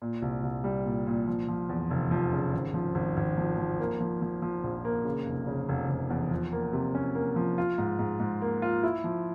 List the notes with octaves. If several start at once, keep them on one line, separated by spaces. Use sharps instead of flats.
A#2
C2
C2
G3
A#2
A#2
F3
F3
E2
F1
F3
C#3
G#1
F3
G#1
G#1
F3
F3
A#3
F3
F3
F3
A#1
A#3
C#3
F1
C#3
F1
F1
E2
F3
A#3
C3
C#4
A#3
F3
F4
G#2
G#2
G#2
A#3
F4
E4
F3